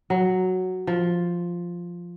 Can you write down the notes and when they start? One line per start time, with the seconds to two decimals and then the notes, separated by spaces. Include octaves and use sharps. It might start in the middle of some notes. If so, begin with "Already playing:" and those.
0.10 F#3
0.87 F3